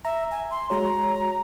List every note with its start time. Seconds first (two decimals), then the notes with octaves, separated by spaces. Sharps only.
0.05 E5 A#5
0.31 G#5
0.51 C6
0.70 G#3 F#4 C#5 A#5